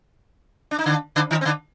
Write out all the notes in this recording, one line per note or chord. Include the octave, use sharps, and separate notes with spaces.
D4
D#4
D3 D4
D3 D4
D#3 D#4
C4
D3 D4